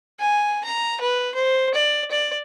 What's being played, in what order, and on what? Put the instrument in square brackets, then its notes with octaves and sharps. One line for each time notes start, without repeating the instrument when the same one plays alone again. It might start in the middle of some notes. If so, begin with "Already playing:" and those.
[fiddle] G#5
A#5
B4
C5
D5
D5